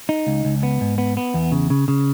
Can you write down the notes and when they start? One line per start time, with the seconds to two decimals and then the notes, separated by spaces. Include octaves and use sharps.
0.09 D#4
0.27 C#2
0.45 C#2
0.63 B3
0.81 G#2
0.98 B3
1.17 B3
1.34 E2
1.52 C#3
1.70 C#3
1.88 C#3